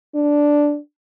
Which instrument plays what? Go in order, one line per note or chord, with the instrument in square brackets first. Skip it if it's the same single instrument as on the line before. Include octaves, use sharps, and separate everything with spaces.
[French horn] D4